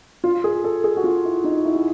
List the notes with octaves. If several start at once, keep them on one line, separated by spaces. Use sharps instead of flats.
F4
G#4
A4
G#4
F#4
F4
E4
D#4
E4
F4